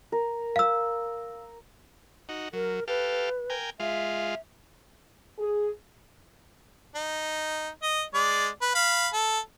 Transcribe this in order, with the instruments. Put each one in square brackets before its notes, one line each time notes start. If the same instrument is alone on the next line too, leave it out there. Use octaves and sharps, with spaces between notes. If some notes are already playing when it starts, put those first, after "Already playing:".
[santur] A#4
[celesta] F5 E6
[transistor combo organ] D#4 F#4
[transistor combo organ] F#3 [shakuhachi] A#4
[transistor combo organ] G4 A4 F5 [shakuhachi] B4
[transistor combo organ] A#4 G5 G#5
[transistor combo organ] G#3 F4 [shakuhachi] E5
[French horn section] G#4
[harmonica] D#4
D#5
G#3 D5
B4
F5 B5
A4